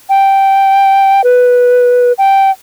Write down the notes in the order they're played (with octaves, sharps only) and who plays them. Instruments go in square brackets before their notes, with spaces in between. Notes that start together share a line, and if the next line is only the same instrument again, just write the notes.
[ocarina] G5
B4
G5